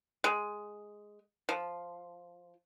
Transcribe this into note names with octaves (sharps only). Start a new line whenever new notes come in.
G#3
F3